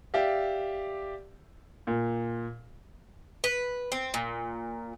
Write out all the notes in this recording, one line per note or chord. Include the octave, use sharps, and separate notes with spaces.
G4 D5 E5 F5
A#2
B4
C4
A#2